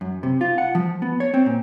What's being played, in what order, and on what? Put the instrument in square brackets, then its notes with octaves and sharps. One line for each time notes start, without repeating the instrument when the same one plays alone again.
[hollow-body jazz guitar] F#2
C3
F4
F#5
F3
B3
C#5
C4
A#2